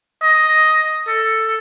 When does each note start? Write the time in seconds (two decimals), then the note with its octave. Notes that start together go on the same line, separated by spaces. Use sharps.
0.22 D#5
1.08 A4